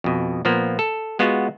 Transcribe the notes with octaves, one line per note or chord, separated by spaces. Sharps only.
F2 B2
A#2 F3 A#3 B3
A4
G#3 B3 F4 F#4